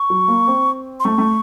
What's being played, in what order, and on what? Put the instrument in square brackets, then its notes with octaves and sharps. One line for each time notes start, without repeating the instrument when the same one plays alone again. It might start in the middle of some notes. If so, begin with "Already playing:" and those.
Already playing: [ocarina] C#6
[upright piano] F#3
A#3
C4
[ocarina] C6
[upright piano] A3 [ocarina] C#6
[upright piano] A3